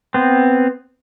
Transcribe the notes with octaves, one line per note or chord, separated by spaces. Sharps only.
B3 C4